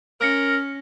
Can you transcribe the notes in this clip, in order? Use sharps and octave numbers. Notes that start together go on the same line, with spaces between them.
C#4 A#4 F6 A#6 C#7